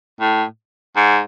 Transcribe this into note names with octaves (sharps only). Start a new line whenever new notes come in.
A2
G#2